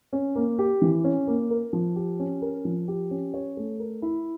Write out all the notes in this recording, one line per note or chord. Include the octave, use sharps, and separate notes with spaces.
C#4
A#3
G4
E3
C#4
A#3
A#4
F3
G4
C#4
A#4
F3
G4
C#4
C#5
A3
A#4
E4